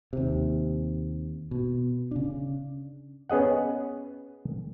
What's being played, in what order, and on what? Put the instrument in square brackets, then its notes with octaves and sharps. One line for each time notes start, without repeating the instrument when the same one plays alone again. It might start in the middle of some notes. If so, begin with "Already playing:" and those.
[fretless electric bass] D#2 C3
B2
C#3 D4
[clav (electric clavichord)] B3 C#4 G#4 D#5 F#5